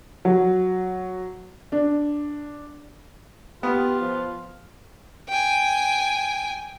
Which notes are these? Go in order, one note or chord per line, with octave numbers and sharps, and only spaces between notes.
F#3
D4
B3 F4 G4
F3
G5 G#5